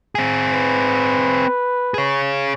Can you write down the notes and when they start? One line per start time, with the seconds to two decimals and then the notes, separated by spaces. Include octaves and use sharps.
0.15 C4 G#4
0.54 B4
1.94 G#4 C#5